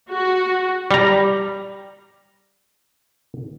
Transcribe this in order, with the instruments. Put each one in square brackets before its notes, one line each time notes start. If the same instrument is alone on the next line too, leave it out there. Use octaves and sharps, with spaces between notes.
[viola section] F#4
[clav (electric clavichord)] G3 A#5